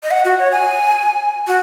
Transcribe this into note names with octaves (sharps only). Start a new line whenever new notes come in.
D#5
F#5
F#4
C#5
G#5
F#4